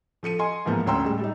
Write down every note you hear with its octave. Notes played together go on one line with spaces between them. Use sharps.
F3 A4 C#7 D#7
D#5 G#5 C6
G#2 E3 F3 A#3 B3
D2 C#4 G5 A#5 C6 E6
A2 G3 G#3
G3 D#4